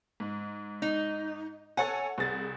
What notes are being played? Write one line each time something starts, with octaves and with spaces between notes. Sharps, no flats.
G#2
D#4
A4 C#5 F#5 G#5
C2 G#4 A6